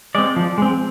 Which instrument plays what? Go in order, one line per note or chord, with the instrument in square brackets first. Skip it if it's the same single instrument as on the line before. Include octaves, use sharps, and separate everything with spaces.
[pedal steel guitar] G#3 C4 D5
F3
G#3 C4